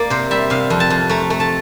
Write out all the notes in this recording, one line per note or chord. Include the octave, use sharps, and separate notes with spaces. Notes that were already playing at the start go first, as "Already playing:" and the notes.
Already playing: A#3 D5
C3 C5
G3 E5
C3 F5
F2
A5
F2
A3 A#5
A3
A5